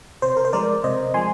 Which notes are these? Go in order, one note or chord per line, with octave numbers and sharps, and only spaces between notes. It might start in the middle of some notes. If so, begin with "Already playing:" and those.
C3 C5
A#4
C5
F3 G#3 A#4 D5
C3 C5 D#5
F3 G#3 G#5 C6